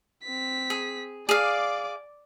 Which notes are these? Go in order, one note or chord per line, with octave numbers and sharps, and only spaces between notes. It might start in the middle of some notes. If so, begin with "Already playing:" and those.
C4 B6
G#4
G#4 D5 F5 D6